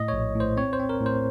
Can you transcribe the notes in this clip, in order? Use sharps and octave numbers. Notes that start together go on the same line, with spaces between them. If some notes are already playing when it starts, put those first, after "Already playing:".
Already playing: A2 D#5
A#1 C#5
A2
C5
C4 C#5
C5
C4
A#4
A2
C5